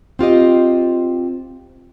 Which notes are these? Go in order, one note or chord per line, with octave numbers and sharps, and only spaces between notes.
C4 F4 G4 D#5